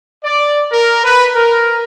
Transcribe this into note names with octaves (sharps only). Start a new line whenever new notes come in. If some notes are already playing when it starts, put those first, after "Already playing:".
D5
A#4
B4
A#4